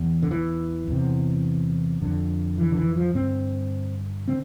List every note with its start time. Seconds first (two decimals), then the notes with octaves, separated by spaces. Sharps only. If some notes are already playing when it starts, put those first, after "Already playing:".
Already playing: E2
0.23 D3
0.31 E3
0.87 E2 C3
2.02 F2 D3
2.58 E3
2.71 D3
2.77 E3
2.96 F3
3.14 G2 D3 C4
4.28 D3 C4